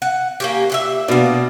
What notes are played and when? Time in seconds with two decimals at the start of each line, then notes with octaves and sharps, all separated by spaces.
0.02 F#5
0.40 A#3 C#4 G4
0.70 A#2 F#4 E5
1.08 B2 A#3 D4 D5